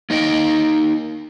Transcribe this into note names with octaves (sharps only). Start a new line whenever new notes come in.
A#3 D#4 D#5 G5